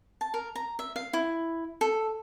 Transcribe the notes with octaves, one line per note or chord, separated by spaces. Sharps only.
A5
A#4
A#5
E5
F5
E4
A4